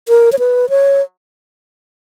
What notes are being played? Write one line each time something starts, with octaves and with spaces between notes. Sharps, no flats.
A#4
C#5
B4
C#5